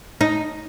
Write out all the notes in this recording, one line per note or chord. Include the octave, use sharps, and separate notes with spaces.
D#4